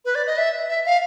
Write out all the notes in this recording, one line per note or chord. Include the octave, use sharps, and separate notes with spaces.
B4
D5
D#5
E5
E5
F5